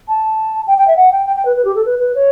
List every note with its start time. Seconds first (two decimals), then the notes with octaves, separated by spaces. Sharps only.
0.08 A5
0.67 G5
0.78 G5
0.88 E5
0.97 F#5
1.12 G5
1.26 G5
1.36 G5
1.45 B4
1.56 B4
1.65 G4
1.76 A4
1.86 B4
1.99 B4
2.15 C#5